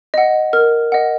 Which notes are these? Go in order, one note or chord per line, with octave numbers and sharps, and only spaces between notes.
D#5 F#5
A#4 F6
D#5 F#5